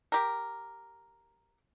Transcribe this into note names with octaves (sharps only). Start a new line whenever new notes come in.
G4 A#4